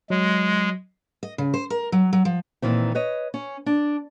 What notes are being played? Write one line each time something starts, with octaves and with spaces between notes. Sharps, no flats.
F#3 G#3
D#5
C#3
C5
A#4
F#3
F#3
F3
A#2 D#3 E3 C4
B4 C#5 D#5
C#4
D4